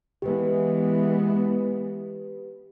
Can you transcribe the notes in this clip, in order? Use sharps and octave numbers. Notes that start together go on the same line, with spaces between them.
E3 G#3 B3 G4 B4